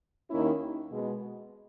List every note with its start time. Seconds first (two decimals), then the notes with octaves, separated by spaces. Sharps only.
0.30 D#2 D#3 A#3 C#4 E4
0.91 B2 G#3 B3